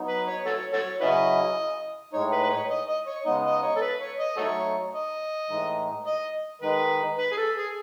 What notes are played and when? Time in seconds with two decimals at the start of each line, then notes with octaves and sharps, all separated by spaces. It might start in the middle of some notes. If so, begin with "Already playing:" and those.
Already playing: F#3 B3 D#4
0.08 B4
0.27 C#5
0.46 F#4 A4 C#5
0.73 F#4 A4 C#5
1.01 C#3 F#3 C#4 E4 F#4 B4 D#5
2.13 A2 G#3 D#4 C#5
2.32 B4
2.43 B4
2.50 C#5
2.70 D#5
2.88 D#5
3.06 C#5
3.25 C#3 G#3 B3 D#4 D#5
3.45 D#5
3.62 C#5
3.76 A4
3.81 B4
4.00 C#5
4.19 D#5
4.37 F#3 A3 D#4 F#4 A4 C#5
4.93 D#5
5.50 A2 E3 G#3 D#4
6.06 D#5
6.61 D#3 G#3 D#4 B4
7.19 B4
7.32 G#4
7.37 A4
7.56 G#4